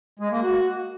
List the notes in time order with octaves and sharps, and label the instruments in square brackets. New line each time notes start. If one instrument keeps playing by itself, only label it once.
[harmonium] G#3
A#3
F#4